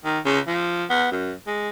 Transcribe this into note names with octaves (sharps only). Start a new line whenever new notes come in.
D#3
C#3
F3
B3
F#2
G#3